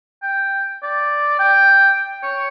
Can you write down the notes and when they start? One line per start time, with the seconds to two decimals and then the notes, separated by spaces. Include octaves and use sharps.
0.23 G5
0.83 D5
1.39 G5
2.23 C#5